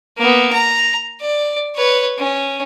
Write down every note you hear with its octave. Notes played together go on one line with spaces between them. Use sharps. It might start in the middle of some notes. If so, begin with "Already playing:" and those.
A#3 B3
A#5
D5
B4 C#5
C#4